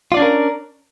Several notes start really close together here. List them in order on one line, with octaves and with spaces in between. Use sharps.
F4 D5 D4 C#4 A#4